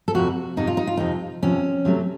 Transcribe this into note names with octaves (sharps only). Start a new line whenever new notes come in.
A4
F2 C3 F3 F#4
F2 C3 F3 D#4
F4
D#4
F4
F2 C3 F3 D#4
F2 C3 F3 C#4
C3 F#3 A3